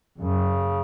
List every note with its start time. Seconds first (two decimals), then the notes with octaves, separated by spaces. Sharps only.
0.18 F#2 C#3